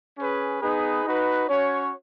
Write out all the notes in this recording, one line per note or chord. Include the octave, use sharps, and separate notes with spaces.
C#4 G#4 B4
B3 D#4 G#4 B4
D#4 F#4 B4
C#4 F#4 C#5